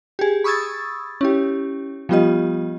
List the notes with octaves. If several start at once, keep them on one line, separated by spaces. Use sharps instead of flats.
G4 G#4
B5 C#6 D#6 E6 G#6 A6
C#4 E4 G4
F3 G3 B3 F4 G4 D#5